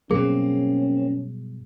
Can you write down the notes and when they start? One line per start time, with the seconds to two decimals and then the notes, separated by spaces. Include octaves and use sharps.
0.11 G2 B2 F#3 A#3 C4 C#4 G#4